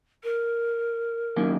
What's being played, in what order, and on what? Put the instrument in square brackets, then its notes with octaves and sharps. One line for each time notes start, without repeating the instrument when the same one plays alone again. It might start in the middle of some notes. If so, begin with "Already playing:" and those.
[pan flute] A#4
[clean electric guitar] F#2 D#3 A#3